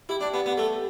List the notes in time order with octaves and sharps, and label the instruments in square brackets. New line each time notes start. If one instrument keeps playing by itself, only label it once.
[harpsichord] E4 [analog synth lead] G4
[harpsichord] D4
B3
B3
A3